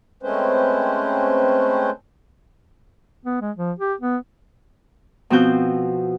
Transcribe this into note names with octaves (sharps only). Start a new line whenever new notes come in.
G#3 A3 C4 C#4 B4 C5
B3
G#3
F3
G4
B3
B2 F3 C4 F#4 G6